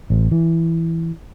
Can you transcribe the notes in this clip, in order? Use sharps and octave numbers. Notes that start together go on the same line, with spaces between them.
A1
E3